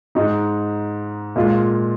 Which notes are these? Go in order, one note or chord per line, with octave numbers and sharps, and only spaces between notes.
G#2 G#3 D#4
A#2 G#3 F4